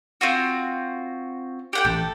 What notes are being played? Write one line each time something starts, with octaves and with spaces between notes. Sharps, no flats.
C4 F4 F#4
G4 F#5 G5
A1 A4